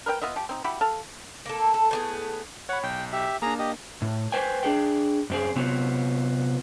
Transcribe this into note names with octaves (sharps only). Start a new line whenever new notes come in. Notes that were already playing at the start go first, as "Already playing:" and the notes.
A#4 B4 D#5 G5
B3 F4 D#5 E5
F3 G4
C4 D#4
E4 F#4 G4 B5
A4 F5
A#3 A4
A4
A2 B3 G#4
C#5 F#5 B5
B1 G5
G4 E5
A#3 D4 G#4 A#5
G4 D#5
A2
B4 C5 G5 G#5
D4 G#4 G5
F#2 C4 G#4
C3 F#3 B3 C4 F4 F#4